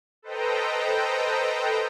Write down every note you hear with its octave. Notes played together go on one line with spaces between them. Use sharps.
A4 B4 C5 D#5 G5 A#5